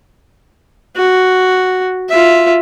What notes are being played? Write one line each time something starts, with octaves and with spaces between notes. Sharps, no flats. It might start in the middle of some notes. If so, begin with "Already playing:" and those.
F#4
F4 E5